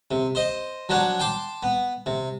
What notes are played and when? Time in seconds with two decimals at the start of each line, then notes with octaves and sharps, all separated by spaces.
0.11 C3
0.35 C5 D#5
0.89 F3 F#3 D4 C#5 F#5
1.20 G5 A5 C6 D6
1.63 B3
2.06 C3